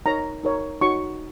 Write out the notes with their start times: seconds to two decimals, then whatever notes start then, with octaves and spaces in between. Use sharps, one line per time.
0.06 D#4 A#4 C#5 A#5
0.43 D#4 A#4 C#5
0.81 D#4 F#4 C#5 C#6